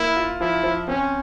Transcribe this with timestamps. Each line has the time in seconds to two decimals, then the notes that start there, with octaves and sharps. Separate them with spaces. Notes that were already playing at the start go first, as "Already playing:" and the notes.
Already playing: A#3 E4
0.17 F4
0.41 F3 E4
0.64 F3
0.88 C4 C#4